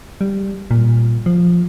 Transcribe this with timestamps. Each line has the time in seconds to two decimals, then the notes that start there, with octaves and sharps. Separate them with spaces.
0.21 G3
0.71 A#2
1.26 F3